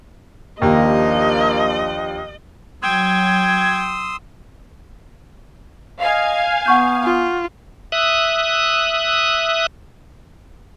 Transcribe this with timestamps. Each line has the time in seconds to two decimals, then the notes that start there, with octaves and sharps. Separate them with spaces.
0.62 D#2 F3 A#3 D4 G4 D#5
2.82 F#3 G5 C6 D#6 E6 G#6
6.01 D#5 F5 G#5
6.66 B3 F#5 C#6 G6
7.04 F4
7.92 E5 D#6 F#6